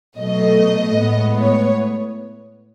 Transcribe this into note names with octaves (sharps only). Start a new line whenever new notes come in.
B2 F#3 A3 D#5
A2 G#3 B3
C#5